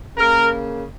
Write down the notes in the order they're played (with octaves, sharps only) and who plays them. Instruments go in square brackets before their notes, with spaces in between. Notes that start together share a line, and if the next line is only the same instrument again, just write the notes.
[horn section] C#3 A#3 A#4